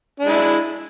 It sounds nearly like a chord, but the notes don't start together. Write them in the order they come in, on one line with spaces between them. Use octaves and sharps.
D4 G#3 E4